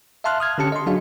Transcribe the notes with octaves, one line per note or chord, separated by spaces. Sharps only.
E5 F5 A5 C6 F6 F#6
D#6 F6 G#6
D3 C#4 G4 A5 C#7
D#5 C6
F#3 D4 F#4 G#4 F5